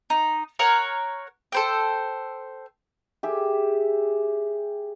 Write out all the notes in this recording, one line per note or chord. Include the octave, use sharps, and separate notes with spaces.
D#4
A#4 C#5 F#5
A4 C5 G5
G4 G#4 E5